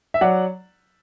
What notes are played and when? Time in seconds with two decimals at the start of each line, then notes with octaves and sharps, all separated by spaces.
0.14 E5
0.21 F#3 D5 F#5